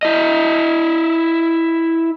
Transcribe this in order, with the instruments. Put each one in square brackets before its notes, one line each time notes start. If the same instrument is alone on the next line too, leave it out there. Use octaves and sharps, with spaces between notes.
[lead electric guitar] E4 D#5